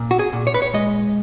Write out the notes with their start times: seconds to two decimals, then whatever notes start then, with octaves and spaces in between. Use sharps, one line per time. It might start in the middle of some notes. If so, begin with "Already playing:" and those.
Already playing: A#2
0.11 F#4
0.19 G#4
0.33 A#2
0.47 C#5
0.54 B4
0.62 C#5
0.74 G#3 D#5